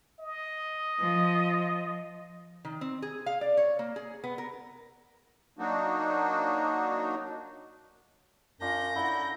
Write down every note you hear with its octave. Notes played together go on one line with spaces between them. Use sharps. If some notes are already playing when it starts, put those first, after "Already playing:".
D#5
F3
D#3
C4
G#4
F5
D5
C#5
A#3
G#4
B3
A#4
F#3 A#3 D4 D#4 F#4
F#2 D4 F4 G6 A#6
D3 F#3 E4